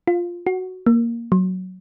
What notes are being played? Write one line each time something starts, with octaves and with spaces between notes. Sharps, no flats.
F4
F#4
A#3
F#3